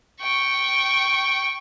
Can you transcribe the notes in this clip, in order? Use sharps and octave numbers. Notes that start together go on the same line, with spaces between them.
G5 C#6